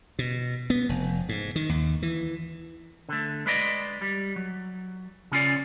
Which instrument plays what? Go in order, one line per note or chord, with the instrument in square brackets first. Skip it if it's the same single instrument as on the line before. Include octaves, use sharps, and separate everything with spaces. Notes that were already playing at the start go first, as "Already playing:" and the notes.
[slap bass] B2
B3
F1
G#2
D#3
D#2
E3
[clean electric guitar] D3 A3
G#3 B4 D5 D#5
G3
F#3
C#3 C#4 F4 D5